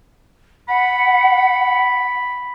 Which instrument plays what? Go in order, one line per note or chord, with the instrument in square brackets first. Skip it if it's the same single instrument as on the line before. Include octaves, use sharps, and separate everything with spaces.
[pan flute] F#5 [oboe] B5